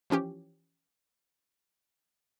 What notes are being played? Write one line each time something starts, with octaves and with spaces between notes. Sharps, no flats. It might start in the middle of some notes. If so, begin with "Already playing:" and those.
E3 F3 C#4 G4